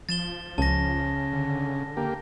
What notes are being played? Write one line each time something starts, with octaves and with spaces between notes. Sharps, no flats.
F3 A6 E7 G7
C#2 C#3 A5 A#6
D3
A#3 G4